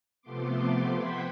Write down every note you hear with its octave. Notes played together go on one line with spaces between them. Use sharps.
C3 F3 A3 B3 C6 D6
B4 C5 F#5 G5 G#6 B6